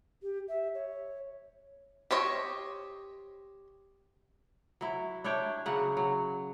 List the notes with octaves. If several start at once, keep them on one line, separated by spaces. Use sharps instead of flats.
G4
E5
C#5
G4 C5 C#5 D#5
F#3 E4
D4 E4 C#5 G5
C#3 F#3 F#5
F#3